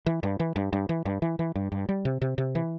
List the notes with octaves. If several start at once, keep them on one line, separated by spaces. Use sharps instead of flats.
E3
G2
E3
G2
G2
E3
G2
E3
E3
G2
G2
G3
C3
C3
C3
E3